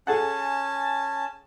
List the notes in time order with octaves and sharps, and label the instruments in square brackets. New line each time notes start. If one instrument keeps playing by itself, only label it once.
[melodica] C#4 G#5 [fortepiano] G#4 A4 F#5 [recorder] A5